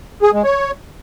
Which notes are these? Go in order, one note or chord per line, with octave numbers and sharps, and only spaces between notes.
G#4
G#3
C#5